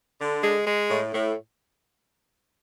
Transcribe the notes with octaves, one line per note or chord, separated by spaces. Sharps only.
D3
G#3
G#3
A2
A2